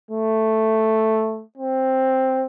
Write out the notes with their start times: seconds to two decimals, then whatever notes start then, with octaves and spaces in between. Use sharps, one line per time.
0.11 A3
1.58 C4